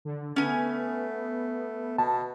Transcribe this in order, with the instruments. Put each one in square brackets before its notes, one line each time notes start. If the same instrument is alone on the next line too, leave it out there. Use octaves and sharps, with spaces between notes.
[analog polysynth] D3
[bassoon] A3 [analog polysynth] B3 [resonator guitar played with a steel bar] C#4 G#5
[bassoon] B2 [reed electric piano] A5